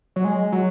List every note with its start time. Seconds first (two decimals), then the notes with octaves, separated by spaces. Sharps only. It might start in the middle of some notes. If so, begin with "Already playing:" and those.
0.16 F#3
0.24 G#3
0.52 F#3